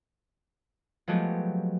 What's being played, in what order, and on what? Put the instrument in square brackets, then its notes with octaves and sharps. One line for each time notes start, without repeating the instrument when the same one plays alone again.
[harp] F3 F#3 G#3 A3 B3 G4